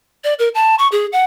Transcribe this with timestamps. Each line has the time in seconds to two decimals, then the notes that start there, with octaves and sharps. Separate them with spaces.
0.24 D5
0.39 A#4
0.55 A5
0.79 C#6
0.92 G#4
1.12 F#5